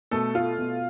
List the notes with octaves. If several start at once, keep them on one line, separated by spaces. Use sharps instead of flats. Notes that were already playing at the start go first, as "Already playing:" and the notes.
B2 A3 A4
A3 F4
B2